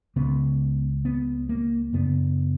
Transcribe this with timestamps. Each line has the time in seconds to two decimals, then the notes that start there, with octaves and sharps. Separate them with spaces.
0.16 C#2 C#3 B3
1.05 B3
1.49 A#3
1.93 F#2 C#3 B3